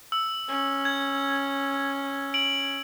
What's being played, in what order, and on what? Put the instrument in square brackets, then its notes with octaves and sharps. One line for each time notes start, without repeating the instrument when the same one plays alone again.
[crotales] E6
[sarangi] C#4
[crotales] G#6
D7 F#7